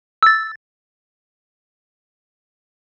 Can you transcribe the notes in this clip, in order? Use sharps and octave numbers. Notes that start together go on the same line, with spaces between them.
E6 A6